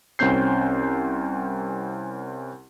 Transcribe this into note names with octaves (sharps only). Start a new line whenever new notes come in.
C2 C4 C#4 G6 C7